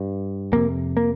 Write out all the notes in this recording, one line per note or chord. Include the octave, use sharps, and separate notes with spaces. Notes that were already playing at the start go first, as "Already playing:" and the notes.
Already playing: G2
F2 C3 A#3
A#3